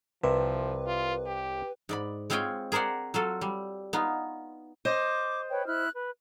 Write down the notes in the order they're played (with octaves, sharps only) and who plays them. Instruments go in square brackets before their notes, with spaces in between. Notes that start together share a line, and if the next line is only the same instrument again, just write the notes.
[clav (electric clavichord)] C2 C3 E5 [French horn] F3 [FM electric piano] B4
[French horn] F4
G4
[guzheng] G#2 D5 B5
G#3 C4 F4 C#5 G5 G#5
G#4 A#4 C5 D5 F#5
F#3 F4 A4
G3
B3 D#4 F4
[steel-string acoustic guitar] C5 D#5 [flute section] D6
[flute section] B4 C#5 G5
E4 F6 F#6
B4